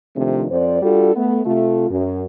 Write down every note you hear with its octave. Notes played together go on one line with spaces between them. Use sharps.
C3 D#3 F3 A3 C4 D4
F2 C5 D5
G3 D4 F4 F#4 A4
A3 B3
C3 A3 F4
F#2